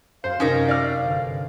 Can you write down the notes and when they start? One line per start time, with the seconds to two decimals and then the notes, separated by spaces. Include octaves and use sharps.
0.24 F#2 C5 F5 G5
0.40 F#2 C3 C#4 D#4 A#4
0.68 D5 F6 G6
1.05 G1